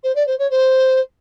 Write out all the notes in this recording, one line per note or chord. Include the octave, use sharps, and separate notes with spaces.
C5
D5
C5
C#5
C5